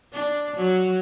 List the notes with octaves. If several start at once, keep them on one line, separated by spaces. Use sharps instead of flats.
D4
F#3